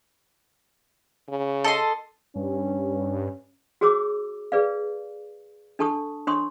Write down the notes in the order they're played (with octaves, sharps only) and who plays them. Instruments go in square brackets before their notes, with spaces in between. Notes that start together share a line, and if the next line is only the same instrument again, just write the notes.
[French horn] C#3
[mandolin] A4 D#5 C6
[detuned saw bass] G2 [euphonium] C#4
[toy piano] F#4 G#4 C#5 D6 E6
G#4 B4 D5 F5
D4 A4 A5 C#6 D#6
D4 C#5 C6 C#6 D#6